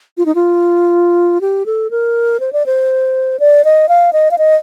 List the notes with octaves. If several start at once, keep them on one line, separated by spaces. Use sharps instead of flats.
F4
D#4
F4
G4
A4
A#4
C5
D5
C5
D5
D#5
F5
D#5
F5
D#5